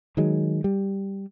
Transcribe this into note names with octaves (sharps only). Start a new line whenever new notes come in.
D#3 F#3 G#3
G3